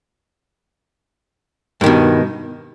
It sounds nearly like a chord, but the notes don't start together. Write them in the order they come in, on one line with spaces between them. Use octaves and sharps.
G2 D#3 B2